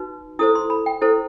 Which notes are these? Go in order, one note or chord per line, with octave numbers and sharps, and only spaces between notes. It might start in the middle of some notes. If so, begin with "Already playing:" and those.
Already playing: D#4 F#4 B4
E4 A4 C5 D#6
C6
B5
G5
E4 A4 C5